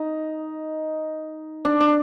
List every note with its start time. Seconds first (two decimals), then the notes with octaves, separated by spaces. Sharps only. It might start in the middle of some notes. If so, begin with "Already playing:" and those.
Already playing: D#4
1.65 D4
1.80 D4